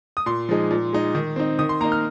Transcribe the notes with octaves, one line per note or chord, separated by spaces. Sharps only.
D#6
A#2 C6
F3 G#3 D#4
A#2
G#3 D#4
D#3
C4 D#4
D#3 D#6
C6
A#3 D#4 A#5
F6